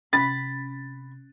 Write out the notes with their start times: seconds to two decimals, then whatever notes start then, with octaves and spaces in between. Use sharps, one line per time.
0.13 C3 C#4 B5 A6